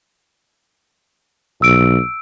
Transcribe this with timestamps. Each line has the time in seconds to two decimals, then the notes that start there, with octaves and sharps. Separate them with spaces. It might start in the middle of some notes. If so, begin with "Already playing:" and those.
1.62 B1 E6 D7